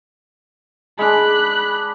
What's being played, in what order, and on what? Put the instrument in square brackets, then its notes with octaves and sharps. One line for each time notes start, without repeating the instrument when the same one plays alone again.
[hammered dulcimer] G#3 D4 [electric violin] B5 F#6